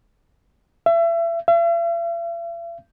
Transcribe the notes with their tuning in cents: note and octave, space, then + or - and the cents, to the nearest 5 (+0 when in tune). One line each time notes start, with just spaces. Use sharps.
E5 +30
E5 +45